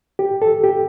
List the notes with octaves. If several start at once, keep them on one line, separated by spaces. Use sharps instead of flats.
G4
A4
G4